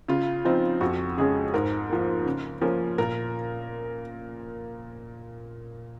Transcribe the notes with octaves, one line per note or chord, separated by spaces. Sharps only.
C#3 F4
F3 C4 D#4
F2 F#4
C#3 G#3 C#4 G#4
G#2 A#4
F3 A#3
C#3
F3 A#3 C#4
A#2 A#4